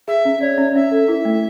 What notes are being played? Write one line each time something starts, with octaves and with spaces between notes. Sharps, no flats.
G#4 E5
C#4
C#5 D5
C#4
C#4 E5
A4
E4
A3